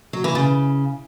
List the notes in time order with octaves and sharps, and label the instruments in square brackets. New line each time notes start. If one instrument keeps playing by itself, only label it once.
[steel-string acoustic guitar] F#3
E3
C#3